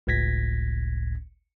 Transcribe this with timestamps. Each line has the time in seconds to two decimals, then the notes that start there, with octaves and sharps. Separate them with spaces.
0.07 G1 C#2 A2 G#6 A#6 B6